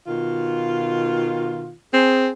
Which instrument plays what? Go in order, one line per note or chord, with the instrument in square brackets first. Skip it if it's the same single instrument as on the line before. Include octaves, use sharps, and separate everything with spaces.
[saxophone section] B2 D#3 F4
[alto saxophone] C4 [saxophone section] G#4